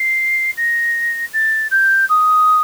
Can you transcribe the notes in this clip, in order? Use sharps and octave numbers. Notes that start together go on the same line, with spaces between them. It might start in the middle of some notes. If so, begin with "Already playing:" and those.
Already playing: C7
A#6
A6
G6
D#6